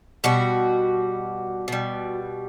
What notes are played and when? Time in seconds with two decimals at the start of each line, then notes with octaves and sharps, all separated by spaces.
0.24 B2 G3 F#4
1.68 B2 G3